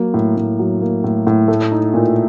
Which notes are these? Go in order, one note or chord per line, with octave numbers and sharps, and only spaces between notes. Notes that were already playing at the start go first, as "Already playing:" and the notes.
Already playing: F#3 A#3
A2
A2
F#3
A#3
A2
A2
A3
D#4
A#2